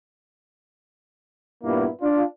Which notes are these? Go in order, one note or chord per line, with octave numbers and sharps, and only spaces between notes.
G2 A#2 A#3 B3 E4
D4 F4